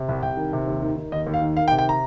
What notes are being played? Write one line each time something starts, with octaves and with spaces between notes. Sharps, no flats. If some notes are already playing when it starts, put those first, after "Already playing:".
Already playing: C3
C2
C2 G5
D#3
C3
D#2
D#3
D#3
D#2 D#5
D#2
F5
D#3
D#3 F5
G5
C3
G5
A#5